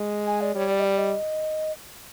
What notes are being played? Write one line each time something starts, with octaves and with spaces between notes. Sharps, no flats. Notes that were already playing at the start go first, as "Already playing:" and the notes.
Already playing: G#3
G#5
D5
G3 C#5
D5
D#5
D5
D#5